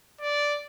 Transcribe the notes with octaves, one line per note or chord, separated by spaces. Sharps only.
D5